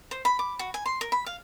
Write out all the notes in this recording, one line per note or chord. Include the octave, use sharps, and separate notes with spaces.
C5
B5
D6
F#4
G#5
C6
A#4
B5
F5